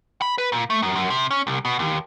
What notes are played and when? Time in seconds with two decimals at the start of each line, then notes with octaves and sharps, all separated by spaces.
0.22 B5
0.38 B4
0.52 A#2
0.70 A3
0.82 F#2
0.95 F#2
1.10 C3
1.31 C#4
1.47 C2
1.65 B2
1.79 D#2